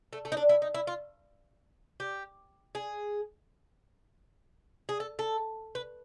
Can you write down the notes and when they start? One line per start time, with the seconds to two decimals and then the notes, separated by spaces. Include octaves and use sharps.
0.13 A3
0.25 A3
0.32 D#4
0.37 D4
0.49 E4
0.62 D#4
0.74 E4
0.87 F4
2.00 G4
2.75 G#4
4.89 G#4
5.00 A4
5.19 A4
5.75 B4